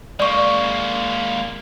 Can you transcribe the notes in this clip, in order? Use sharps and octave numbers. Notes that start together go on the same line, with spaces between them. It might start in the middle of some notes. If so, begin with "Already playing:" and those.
G#3 A#3 D5 C#6